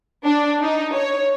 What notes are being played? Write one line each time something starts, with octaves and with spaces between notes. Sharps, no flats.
D4
D#4
C#5